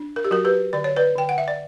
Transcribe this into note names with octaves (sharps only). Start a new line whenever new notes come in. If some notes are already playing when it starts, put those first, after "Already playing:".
Already playing: D4
A#4
G4
F#3 F#4 A#4
G4 B4
D3 D5
C#5
B4 D5
D3 G5
F#5
E5
D5